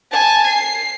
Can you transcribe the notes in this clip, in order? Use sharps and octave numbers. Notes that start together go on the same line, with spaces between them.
G#5 A5
C7